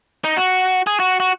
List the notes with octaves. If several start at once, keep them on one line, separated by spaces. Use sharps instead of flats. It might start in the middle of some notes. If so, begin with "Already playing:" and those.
D#4
F#4
G#4
F#4
F#4